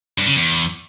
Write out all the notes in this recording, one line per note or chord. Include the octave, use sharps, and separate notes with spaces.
G2
C#3
E2